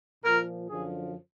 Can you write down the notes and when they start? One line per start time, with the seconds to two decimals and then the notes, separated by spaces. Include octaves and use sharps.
0.23 A#2 F3 A#4
0.68 F#2 D3 F3 G#4